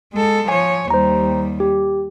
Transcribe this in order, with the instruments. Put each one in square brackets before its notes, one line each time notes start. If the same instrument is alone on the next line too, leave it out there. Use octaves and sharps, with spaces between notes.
[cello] G#3 A4
[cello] F3 C#5 [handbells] G#5
[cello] D#2 G3 [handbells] C5 A#5
[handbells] G4